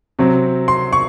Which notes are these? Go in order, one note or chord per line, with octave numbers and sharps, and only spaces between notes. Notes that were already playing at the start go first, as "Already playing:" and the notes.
C3 F#3 C4
C6
C#6